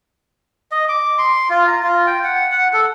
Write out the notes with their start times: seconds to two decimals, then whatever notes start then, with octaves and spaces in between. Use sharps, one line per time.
0.72 D#5
0.88 D6
1.18 C6
1.50 F4
1.67 A#5
1.83 F4
2.07 G5
2.24 F#5
2.51 F#5
2.73 A4